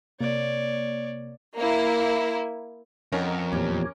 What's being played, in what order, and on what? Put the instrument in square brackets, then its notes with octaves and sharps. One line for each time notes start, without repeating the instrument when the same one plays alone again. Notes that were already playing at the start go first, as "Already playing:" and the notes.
[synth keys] C3 A#3 [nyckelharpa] C#5 D5
[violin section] A#3 E4
[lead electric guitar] F2 [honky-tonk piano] C#4 A#4 [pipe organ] D#5 F#5
[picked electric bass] E2 A#2 [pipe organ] G4 C#5